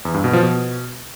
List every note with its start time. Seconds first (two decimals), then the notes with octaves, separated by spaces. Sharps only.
0.05 E2
0.14 G2
0.24 B2
0.33 F3
0.43 B2